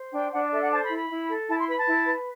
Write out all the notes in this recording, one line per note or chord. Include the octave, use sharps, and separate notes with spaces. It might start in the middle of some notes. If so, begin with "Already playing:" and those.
Already playing: C5
D4 G5
D4 F#5
D5
A4 E5
F#5
C5 A5
B5
E4
B5
E4
A4
E4 A5
C6
B4 B5
A5
E4
B4